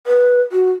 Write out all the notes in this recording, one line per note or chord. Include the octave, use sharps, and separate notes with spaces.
B4
F#4